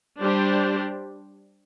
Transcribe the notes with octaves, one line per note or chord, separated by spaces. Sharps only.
G3 D4 G4 C5